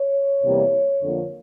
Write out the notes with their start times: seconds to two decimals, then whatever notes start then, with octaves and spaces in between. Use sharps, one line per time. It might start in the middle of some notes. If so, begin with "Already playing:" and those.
Already playing: C#5
0.43 E2 C3 E3 G3 A#3
1.01 F2 D3 F3 A#3